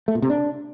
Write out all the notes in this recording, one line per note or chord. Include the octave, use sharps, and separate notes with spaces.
A3
A#2
C3
D4